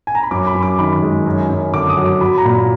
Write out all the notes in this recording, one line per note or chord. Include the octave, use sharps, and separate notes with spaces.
G#5
A#5
B5
F#2 D6
B5
F#2
D6
D#3 B5
G#3
F#2
F#2
D3 D6
D#6
F#3
D6
F#3 B5
A#5
A#2 B5